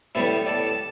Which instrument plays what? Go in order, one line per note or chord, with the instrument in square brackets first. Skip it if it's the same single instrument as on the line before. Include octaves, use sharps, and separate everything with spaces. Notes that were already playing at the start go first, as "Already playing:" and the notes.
[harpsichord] A2 G3 B3 E4 A4
A4 D5
A5